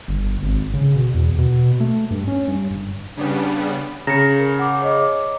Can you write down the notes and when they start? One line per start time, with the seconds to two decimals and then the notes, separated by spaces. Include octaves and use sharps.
0.08 G1
0.43 G#1
0.74 C#3
0.96 B2
1.15 E2
1.38 B2
1.80 A3
2.11 G2
2.28 C#4
2.48 G2
2.71 G1
3.17 C#3 G3 B3 D4
4.07 C#3 A#5 A#6 C#7
4.39 A#4
4.59 F#5 D6
4.82 C#5 D#5 D6